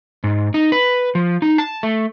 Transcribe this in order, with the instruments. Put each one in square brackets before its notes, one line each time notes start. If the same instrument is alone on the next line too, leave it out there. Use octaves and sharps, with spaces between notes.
[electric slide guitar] G#2
D#4
B4
F3
D#4
A5
A3